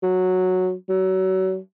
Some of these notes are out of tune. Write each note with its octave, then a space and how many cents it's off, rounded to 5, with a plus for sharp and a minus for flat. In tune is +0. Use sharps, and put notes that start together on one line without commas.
F#3 -5
F#3 +30